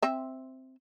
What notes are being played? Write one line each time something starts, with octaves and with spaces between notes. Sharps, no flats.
C4 E5